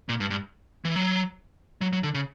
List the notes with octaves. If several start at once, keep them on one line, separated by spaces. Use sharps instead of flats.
A#2
G2
G2
E3
F#3
F#3
F#3
D3
C#3